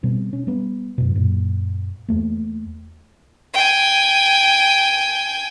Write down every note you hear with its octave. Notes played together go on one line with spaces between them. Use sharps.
B2 G3 C4
C#4
G3 B3
F#2 B2
F#2 A#2
E2 A3 A#3
G5 G#5